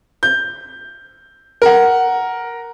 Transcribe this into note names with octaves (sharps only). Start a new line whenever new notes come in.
G6
A#4 F#5